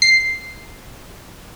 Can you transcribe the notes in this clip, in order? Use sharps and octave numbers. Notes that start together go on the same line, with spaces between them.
C7